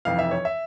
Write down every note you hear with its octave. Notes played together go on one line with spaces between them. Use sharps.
F1 F2 E3 F5
E5
C#5
E5